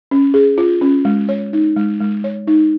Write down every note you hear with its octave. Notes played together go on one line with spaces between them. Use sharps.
C#4
G#4
F4
C#4
G#3
C#5
D#4
G#3
G#3
C#5
D#4